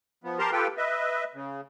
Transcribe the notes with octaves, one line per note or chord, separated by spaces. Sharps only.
F3 B3
G4 A#4 A5 A#5 C6
F4 G4 A4 B4 G5
B4 D#5 E5
C#3